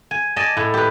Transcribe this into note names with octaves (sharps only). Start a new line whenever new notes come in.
G#5
D5 D#5 G#5 A5
A2
G4 B4